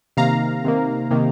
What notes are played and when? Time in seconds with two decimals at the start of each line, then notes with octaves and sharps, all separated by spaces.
0.17 C3 D#3 A#3 F5 A#5
0.64 C3 D#3 A#3
1.11 C3 D#3 A#3